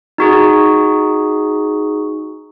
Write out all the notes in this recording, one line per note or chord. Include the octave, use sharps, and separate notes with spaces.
D#4 F#4 G#4